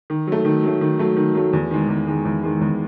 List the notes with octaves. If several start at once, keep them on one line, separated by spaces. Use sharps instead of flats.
D#3
F#3 A3
D#3
F#3 A3
D#3
F#3 A3
D#3
F#3 A3
E2
D#3 G#3
E2
D#3 G#3
E2
D#3 G#3
E2